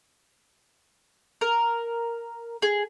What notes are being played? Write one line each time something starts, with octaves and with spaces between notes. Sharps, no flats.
A#4
G#4